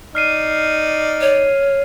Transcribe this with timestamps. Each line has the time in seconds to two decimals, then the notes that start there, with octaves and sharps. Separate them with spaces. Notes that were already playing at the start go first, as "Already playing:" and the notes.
0.15 D#4 D5 F6 C7 D#7
1.21 C#5